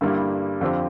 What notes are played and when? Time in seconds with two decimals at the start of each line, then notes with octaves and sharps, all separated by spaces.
0.01 G2 D3 G3 A#3 E4
0.61 F2 D3 F3 C4 G4